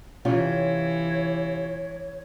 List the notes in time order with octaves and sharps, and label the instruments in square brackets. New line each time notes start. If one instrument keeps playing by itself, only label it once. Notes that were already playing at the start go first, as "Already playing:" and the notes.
[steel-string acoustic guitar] C3 C#4 F4 [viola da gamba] E3 [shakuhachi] C#5